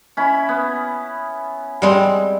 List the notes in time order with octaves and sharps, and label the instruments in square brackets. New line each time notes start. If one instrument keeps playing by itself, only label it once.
[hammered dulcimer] C#4 E4 B5
B3
[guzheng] G3 G#3 C4